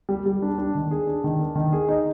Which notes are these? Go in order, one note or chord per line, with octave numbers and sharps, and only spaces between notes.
G3
G3
D4
D4
D#3
G#4
D4
D#3
D4
D#3
G#4
D#4